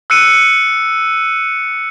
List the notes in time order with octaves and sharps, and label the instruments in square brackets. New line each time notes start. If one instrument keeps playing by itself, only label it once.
[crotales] E6 F#6 C#7 D#7